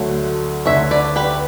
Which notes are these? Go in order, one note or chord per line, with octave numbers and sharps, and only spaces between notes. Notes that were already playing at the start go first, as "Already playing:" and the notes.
Already playing: D2 D3 F#3 A3 C#5
D2 D3 A3 C#5 E5
B4 D5
G4 B4